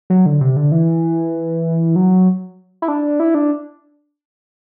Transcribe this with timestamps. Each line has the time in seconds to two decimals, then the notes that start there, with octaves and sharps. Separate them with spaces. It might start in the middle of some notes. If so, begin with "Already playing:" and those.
0.10 F#3
0.26 D3
0.41 C3
0.56 D3
0.72 E3
1.96 F#3
2.82 E4
2.88 D4
3.20 E4
3.35 D4